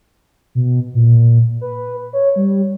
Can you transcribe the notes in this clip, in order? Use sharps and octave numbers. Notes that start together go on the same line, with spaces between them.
B2
A#2
B4
C#5
G3